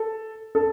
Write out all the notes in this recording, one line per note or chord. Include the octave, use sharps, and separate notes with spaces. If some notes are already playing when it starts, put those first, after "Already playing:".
Already playing: A4
A4